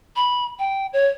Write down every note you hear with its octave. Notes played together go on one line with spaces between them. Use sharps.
B5
G5
C#5